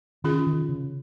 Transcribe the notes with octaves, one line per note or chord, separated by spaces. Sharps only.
D#3 C#4 F4 G#4
D#3
C#3